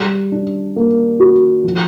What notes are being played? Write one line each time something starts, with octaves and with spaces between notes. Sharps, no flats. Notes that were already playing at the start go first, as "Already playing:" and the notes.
Already playing: G3
D4
A#3
F#4
F3